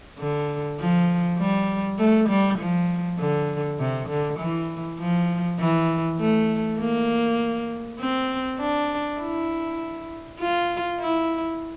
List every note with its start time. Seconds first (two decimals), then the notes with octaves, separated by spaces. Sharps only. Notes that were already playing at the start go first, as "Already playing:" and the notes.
0.19 D3
0.79 F3
1.38 G3
1.98 A3
2.29 G3
2.58 F3
3.18 D3
3.79 C3
4.09 D3
4.39 E3
4.99 F3
5.59 E3
6.19 A3
6.79 A#3
7.99 C4
8.59 D4
9.20 E4
10.40 F4
11.00 E4